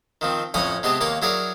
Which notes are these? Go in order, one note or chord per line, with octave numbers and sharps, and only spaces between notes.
D#3 F3 C4
F2 A2 C#4 C#5 G#5 D#6
C3 G#3 B3 G4 D#5 A5
D#2 A#3 C#5 C6 D6
F#3 E4 G#4 A#4 C#5 D5